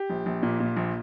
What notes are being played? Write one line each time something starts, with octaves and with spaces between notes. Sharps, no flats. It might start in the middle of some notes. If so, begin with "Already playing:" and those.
Already playing: G4
A#1
A#1
A#2
A#2
A#1